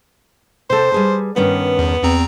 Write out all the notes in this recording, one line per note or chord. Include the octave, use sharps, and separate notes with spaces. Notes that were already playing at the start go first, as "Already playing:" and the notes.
C3 A4 C5
G3 G#4 B4
G2 D#3 B3 C#4
E2
E2 C4 A#5